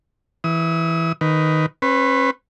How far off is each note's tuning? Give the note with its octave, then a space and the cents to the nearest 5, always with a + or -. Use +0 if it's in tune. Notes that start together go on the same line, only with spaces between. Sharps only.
E3 +0 D#6 +40
D#3 +0 B4 +10
C#4 -40 B4 +15